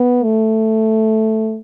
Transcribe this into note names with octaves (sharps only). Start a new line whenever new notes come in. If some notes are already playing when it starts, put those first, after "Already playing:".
Already playing: B3
A3